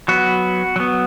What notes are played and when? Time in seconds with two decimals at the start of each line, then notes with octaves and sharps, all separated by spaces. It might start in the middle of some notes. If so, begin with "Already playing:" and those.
0.08 F#3 B3 F#4
0.76 F#3 B3